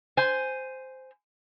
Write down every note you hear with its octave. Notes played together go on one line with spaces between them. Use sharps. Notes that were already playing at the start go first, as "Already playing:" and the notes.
C5 G#5